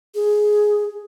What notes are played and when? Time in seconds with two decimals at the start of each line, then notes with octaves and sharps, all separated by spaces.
0.15 G#4